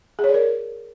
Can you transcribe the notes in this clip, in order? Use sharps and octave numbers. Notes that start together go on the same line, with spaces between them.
G#4
C#5
D5
A#4